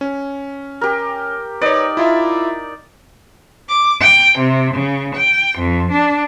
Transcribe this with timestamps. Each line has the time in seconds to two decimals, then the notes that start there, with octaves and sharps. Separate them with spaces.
0.01 C#4
0.81 G4 A#4
1.61 D#4 B4 C#5 D5
1.97 E4 F4 E5
3.69 D6
4.01 G5
4.40 C3
4.75 C#3
5.15 G5
5.59 F2
5.92 D4